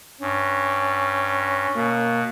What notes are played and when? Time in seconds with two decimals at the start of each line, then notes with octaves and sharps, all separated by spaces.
0.21 G2 C#4
1.76 B2 A#3